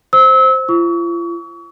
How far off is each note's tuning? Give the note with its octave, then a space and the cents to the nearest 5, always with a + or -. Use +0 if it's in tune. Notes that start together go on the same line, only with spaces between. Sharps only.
C5 +0 E6 -30
F4 -40 C#6 +35